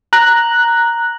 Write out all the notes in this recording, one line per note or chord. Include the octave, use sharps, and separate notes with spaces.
A#5 F#6